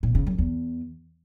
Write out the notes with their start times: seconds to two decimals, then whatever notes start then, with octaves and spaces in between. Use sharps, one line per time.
0.03 A#2
0.15 C#3
0.27 F#2
0.38 E2